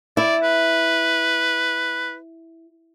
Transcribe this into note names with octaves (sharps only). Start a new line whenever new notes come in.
E4 D5
B4